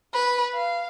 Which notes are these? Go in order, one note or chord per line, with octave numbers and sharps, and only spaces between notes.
B4
F5